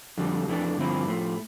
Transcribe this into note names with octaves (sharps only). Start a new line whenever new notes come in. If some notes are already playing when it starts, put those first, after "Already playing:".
F2 D3 G3
F2 E3 A3 D4
G2 D3 F3 C4 E4
A2 F3 A3